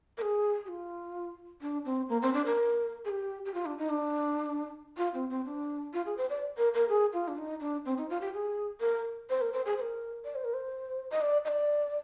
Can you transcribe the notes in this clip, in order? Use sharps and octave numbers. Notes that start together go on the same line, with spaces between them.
A#4
G#4
G4
F4
D4
C4
A#3
C4
D4
A#4
G#4
G4
G4
F4
D4
D#4
D4
F4
C4
C4
D4
F4
G#4
C5
D5
A#4
A#4
G#4
F4
D4
D#4
D4
C4
D#4
F4
G4
G#4
A#4
C5
A#4
C5
G#4
C5
A#4
D5
C5
A#4
C5
D#5
D5
D#5
D5